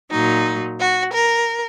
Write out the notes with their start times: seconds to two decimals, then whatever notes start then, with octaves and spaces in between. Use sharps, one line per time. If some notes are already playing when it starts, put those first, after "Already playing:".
0.10 A#2 F#3 D#4
0.78 F#4
1.13 A#4